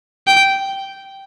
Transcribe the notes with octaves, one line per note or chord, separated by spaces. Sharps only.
G5